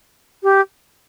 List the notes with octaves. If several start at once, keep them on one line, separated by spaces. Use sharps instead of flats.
G4